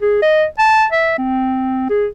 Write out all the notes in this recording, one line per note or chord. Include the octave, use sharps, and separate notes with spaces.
G#4
D#5
A5
E5
C4
G#4